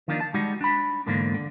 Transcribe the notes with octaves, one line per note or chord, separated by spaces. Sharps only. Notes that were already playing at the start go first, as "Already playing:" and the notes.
D#3 F3 A#3 D4 D#4
A5
G3 G#3 D#4 F#4
D4 B5
E2 G#2 D3 A#3
D3